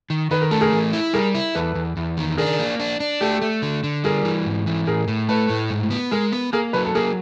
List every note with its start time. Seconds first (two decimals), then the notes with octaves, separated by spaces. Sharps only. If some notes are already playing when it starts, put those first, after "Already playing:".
0.10 D#3
0.31 D#3 B4
0.42 A#4
0.51 A3 A4
0.61 G#4 A#4
0.72 E3
0.93 E4
1.13 G3 G#4 A#4
1.35 E4
1.55 E2 A4 B4
1.75 E2
1.97 E2
2.17 D#3
2.38 D4 G#4 A#4
2.59 A#3
2.80 D4
3.00 D4
3.21 A3 G4 A4
3.42 A3
3.62 D3
3.84 D3
4.04 G3 G#4 A#4
4.25 E3
4.46 G#2
4.66 E3
4.87 A2 G#4 A#4
5.08 A2
5.29 A3 A4 B4
5.49 A2
5.70 G#2
5.90 B3
6.11 G#3 G#4 A#4
6.32 B3
6.53 A#3 G#4 A#4
6.73 F#3 A4 B4
6.86 A4
6.95 A#3 G#4 A#4